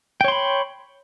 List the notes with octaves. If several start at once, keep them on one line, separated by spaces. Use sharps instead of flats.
C#5 G5 B5 C6